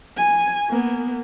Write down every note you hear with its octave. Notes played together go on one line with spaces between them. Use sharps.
G#5
A#3 B3